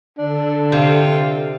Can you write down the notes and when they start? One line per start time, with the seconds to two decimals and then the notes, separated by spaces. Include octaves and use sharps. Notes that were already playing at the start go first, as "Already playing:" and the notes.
0.18 D3 D4 A4
0.72 C3 F4 F5 G5